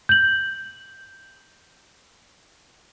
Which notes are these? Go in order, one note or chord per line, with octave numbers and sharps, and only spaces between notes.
G6 F#7